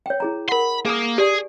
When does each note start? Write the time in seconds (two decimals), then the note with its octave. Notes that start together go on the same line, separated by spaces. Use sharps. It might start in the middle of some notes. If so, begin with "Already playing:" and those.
0.06 C#5 G5
0.20 E4 G#4 A#5
0.49 A#4 F#5 B5 C6
0.85 A#3 G#4 G#5 D#6
1.18 G4 G#4 D5 G#5